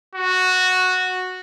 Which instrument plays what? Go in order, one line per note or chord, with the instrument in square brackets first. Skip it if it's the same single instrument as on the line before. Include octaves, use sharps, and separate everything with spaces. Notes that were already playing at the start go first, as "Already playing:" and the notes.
[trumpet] F#4